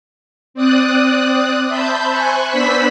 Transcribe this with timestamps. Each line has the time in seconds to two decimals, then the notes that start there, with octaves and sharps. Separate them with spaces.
0.54 C4 D5 D#6 F#6
1.67 C5 E5 A5 B5 G6
2.11 C5 G#5 C#6 F#6
2.50 B3 D4 C5 B5 E6 B6